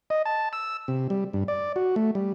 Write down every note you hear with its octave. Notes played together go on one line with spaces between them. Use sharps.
D#5
A5
E6
C3
G3
G2
D5
F#4
A3
G3